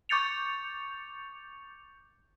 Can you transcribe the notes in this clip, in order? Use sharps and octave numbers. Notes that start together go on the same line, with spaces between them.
C#6 D6 G6 A6 C#7 F7